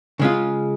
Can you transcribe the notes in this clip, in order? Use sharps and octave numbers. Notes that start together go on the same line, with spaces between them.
C#3 G#3 C#4 F4